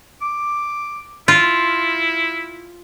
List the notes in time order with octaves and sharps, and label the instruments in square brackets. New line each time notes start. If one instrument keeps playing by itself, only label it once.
[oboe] D6
[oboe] E4 [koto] F4